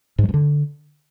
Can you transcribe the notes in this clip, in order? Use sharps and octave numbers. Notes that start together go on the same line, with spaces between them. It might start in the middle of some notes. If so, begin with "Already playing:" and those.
G#2
F#3
G2
D3